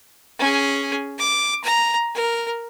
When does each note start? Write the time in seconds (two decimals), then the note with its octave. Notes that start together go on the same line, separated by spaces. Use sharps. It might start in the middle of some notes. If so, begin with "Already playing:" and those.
0.40 C#4 G#4
1.18 D6
1.64 A#5
2.14 A#4